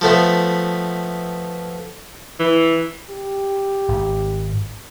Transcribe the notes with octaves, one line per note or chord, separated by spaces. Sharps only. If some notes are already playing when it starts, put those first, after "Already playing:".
F3 A3 B3
E3
G4
G#1